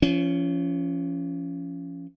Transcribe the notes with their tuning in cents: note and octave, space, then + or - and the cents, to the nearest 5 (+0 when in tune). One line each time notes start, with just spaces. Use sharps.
F3 -30 C#4 +10